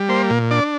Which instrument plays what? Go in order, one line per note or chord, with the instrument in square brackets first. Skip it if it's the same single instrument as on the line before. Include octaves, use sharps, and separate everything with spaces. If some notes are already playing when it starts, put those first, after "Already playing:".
Already playing: [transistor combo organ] G3
A#3 C5
A#2
D4 D5